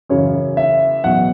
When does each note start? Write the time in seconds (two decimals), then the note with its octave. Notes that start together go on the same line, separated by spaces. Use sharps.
0.09 F#2 C#3 E3 C#5
0.57 E5
1.04 E2 B2 F#3 F#5